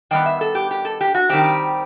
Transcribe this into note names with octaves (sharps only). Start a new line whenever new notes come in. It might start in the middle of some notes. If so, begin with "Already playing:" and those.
D#3 G3 B3 G5
E5
A4
G4
G4
A4
G4
F#4
D#3 G3 C4 G4